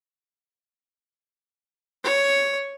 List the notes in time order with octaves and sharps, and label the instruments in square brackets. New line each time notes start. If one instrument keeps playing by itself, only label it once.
[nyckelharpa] C#5